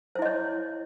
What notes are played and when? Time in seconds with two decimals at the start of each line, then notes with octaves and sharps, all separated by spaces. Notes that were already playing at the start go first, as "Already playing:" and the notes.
0.15 C5
0.19 E4
0.22 D#5
0.25 C#5